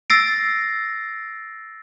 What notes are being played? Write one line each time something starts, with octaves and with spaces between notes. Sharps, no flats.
E6 A6 A#6 C7 D7